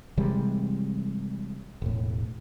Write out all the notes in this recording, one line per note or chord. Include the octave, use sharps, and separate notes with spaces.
C3 E3 G3 G#3
E1 A2